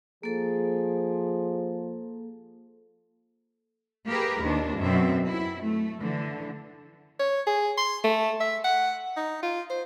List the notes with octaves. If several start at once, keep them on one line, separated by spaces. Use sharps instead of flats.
F3 A#3 G#4 A4
A#3 G4 G#4 A#4 B4
D#2 A#2 D4
F#2 B2 C4 E5
E4
A3
D3 E3
C#5
G#4
C6
A3
E5
F#5
D#4
F4
C5